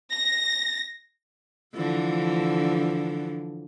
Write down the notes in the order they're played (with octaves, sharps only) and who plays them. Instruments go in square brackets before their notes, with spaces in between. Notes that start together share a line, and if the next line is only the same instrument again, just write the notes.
[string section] A#6
[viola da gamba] D3 E3 F3